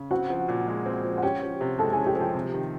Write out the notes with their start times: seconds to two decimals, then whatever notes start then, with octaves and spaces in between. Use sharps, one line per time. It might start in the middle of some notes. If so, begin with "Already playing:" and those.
Already playing: C#3
0.11 C4 F#4 F#5
0.30 F3
0.48 A#2
0.67 G#3
0.86 C4
1.05 F3
1.18 F#5
1.22 C#4 G4 G5
1.42 F3
1.61 C3
1.79 G#3 A4 A5
1.93 G#4 G#5
1.98 C#4
2.06 G4 G5
2.16 F3
2.21 G4 G5
2.34 C3
2.53 D#3